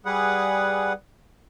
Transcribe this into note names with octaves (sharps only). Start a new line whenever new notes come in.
G3 G#4 B4 F#5